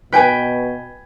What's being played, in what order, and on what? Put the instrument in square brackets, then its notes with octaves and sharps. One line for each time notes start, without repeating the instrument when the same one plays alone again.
[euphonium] B2 [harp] B4 G5 G#5